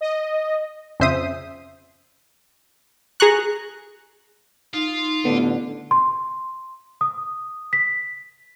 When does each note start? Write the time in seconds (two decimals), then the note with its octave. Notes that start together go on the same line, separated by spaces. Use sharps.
0.01 D#5
1.00 F2 C#3 C5 E5 D#6
3.20 G#4 A#5 C#6 F#6
4.74 D#4 F4
5.25 A1 D3 B3
5.91 C6
7.01 D#6
7.73 B6